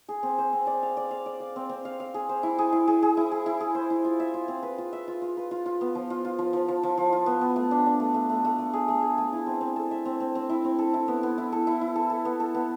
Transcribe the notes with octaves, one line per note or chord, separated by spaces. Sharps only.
G#4
C4
C5
C4
D5
F5
D5
F5
D5
F5
C4
C4
F5
F5
G#4
C5
E4
G#4
E4
G#4
G#4
E4
G#4
E4
G#4
C5
E4
F4
E5
F4
C4
B4
F4
E5
F4
F4
B4
F4
F4
B3
F3
F4
F4
F3
F3
F3
F3
F3
F4
B3
B3
A3
D4
D4
A3
A3
A3
A3
A3
G#4
A3
G#4
A3
E4
C4
C4
A4
E5
C4
C4
C4
E4
C4
A4
E4
B3
B3
E4
A4
E4
E4
A4
A4
B3
A4
B3